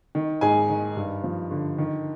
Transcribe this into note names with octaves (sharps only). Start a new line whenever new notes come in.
D#3
G#2 G#4 G#5
D#3
G2
F3
D3
D#3